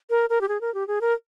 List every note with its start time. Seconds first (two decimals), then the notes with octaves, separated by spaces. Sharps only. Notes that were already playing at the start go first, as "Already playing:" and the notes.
0.10 A#4
0.30 A#4
0.41 G4
0.48 G#4
0.61 A#4
0.74 G4
0.87 G#4
1.01 A#4